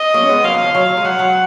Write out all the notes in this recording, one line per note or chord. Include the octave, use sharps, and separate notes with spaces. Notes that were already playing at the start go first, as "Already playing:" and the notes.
Already playing: D#5
F#3 A#3
C#4
G#3 B3
F#3 A#3 F5
F#3
F3
F#3
F#3
G#3
F#3 F#5
F#3